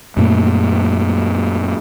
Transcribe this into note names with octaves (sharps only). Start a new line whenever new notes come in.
F#2 A#2 A3 A#3